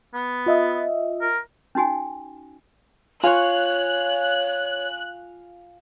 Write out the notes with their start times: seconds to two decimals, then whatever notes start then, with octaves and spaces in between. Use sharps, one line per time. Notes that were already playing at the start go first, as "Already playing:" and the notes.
0.14 B3
0.46 F4 D#5 E5
1.21 A#4
1.75 C#4 D#4 F#4 G#5
3.24 F4 C#5 F5 G#5 C#6 F#6 F7